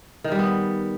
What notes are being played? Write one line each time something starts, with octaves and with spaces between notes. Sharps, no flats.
D#3
G3
B3